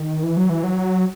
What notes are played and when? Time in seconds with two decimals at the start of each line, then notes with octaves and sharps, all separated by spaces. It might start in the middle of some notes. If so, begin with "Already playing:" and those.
Already playing: D#3
0.23 E3
0.37 F#3
0.50 E3
0.63 F#3